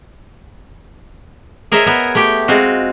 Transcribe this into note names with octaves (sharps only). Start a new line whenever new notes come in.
G#4 A#4 C5 C#5 D#5 E5
B3 A#4
A3 G4 G5
G#3 C4 F4 F#4